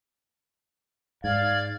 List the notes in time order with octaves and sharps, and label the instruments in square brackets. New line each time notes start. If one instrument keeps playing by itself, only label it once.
[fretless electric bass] G#2 [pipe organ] D5 G#6 [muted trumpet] F5